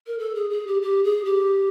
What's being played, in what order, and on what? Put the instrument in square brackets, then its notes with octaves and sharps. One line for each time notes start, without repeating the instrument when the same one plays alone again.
[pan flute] A#4
A4
G#4
G#4
G4
G4
G#4
G4